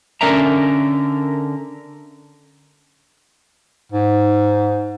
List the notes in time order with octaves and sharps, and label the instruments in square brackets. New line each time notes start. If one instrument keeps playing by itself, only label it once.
[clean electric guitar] D3 C#4 A#4 D5 E5 A#5
[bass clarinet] G#2